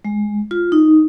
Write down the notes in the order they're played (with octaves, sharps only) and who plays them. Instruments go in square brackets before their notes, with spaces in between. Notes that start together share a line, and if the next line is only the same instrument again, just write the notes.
[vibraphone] G#3
F4
D#4